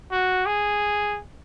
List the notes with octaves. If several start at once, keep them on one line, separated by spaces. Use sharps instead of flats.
F#4
G#4